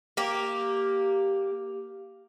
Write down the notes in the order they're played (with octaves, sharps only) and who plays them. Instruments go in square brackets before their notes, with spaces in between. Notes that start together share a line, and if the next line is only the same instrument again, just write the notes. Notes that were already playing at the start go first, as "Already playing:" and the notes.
[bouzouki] A#3 G4